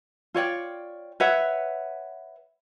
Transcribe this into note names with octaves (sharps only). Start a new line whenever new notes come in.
F4 C#5 D5 G5
B4 C#5 E5 F#5